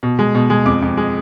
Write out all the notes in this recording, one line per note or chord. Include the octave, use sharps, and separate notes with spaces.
B2
G#3
B2
G#3
F2 D6
F2
G#3